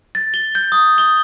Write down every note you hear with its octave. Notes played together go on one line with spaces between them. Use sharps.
A6
G7
G6
D#6
G7